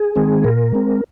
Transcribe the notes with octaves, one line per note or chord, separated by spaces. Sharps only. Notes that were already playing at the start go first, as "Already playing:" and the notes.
Already playing: G#4
D#3 G#3 C4
A#2 A#4
G#3 C4